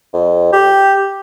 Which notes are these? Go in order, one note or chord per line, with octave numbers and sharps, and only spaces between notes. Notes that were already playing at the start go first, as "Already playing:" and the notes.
F2
G4